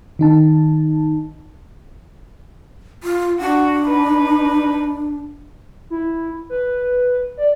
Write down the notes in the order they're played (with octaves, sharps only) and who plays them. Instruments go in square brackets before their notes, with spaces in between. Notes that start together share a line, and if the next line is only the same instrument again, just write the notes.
[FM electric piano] D#3 D#4 A5
[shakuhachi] F4
[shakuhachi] D4 [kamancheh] F#4
[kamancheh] D#4 B4
[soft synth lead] E4
B4
D5